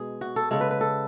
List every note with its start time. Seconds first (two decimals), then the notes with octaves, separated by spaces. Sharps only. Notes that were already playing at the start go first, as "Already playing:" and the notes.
Already playing: B2 G#3 G#4
0.21 F#4
0.36 A4
0.51 C#3 G#3 A4
0.61 B4
0.71 B4
0.81 A4